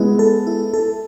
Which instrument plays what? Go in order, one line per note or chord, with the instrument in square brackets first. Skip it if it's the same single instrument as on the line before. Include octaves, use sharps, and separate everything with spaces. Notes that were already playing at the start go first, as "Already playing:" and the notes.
Already playing: [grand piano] G#3 B3 [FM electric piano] E4
[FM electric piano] A4
E4
A4